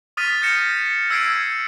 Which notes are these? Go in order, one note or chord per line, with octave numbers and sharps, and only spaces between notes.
C#6 D#6 F6 A6 B6 D#7
D#6 G6 A#6 C#7 E7
E6 G#6 C7 D7 D#7